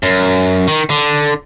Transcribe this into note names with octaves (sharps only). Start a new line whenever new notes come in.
F#2
D#3
D3